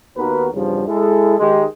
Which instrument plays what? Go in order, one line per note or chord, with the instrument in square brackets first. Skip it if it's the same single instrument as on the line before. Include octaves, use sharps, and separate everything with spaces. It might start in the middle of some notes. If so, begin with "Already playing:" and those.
[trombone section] D#2 D#3 B3 F#4 A#4 B4
E2 G2 C#3 F3 G3
G#3 E4 A4
D#3 G#3 G4